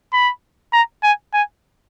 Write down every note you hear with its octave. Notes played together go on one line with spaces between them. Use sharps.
B5
A#5
G#5
G#5